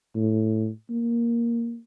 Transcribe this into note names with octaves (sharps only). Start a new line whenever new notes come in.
A2
A#3